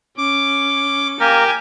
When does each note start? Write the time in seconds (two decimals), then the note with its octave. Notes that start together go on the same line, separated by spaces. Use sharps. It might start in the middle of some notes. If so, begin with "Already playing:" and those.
0.17 C#4 D6
1.20 A#3 G4 A#4 G#5